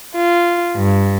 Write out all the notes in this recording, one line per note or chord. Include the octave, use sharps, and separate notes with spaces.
F4
G2